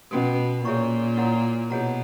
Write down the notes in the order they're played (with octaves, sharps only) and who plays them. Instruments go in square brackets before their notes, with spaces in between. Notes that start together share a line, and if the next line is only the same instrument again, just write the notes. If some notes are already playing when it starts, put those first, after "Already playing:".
[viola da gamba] B2 [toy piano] C#4 F#4 A#4
[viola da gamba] A#2 [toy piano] G#4 C#5 E5 A#5 C#6
[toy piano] E4 A#4 C#5 F#5 A#5
[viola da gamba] B2 [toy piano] E4 G#4 C#5 F#5 A#5